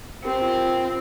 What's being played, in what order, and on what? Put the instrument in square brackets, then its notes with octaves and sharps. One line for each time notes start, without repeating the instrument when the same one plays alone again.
[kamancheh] C4 [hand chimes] G4 A#4
[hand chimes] F4